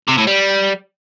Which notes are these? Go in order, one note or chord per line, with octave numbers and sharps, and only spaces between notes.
C3
A2
G3